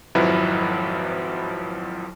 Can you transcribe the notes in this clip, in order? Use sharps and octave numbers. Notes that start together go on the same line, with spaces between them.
G#1 F2 F3 F#3 E4 B4